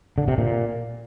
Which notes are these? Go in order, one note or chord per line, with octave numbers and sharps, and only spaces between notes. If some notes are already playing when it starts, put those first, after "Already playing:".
D3
C3
A#2